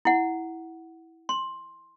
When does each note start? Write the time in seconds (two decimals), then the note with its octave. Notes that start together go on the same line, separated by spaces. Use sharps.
0.05 E4 F#5
1.29 C6